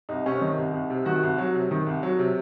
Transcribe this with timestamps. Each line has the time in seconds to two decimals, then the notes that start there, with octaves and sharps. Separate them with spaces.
0.09 C2 D#4
0.26 C3 C#4
0.42 D#3 D#4
0.58 C2
0.73 C2
0.90 C3
1.06 D#3 F#4
1.23 C2
1.38 F#3
1.54 C3
1.71 D#3
1.86 C2
2.03 F#3
2.19 C3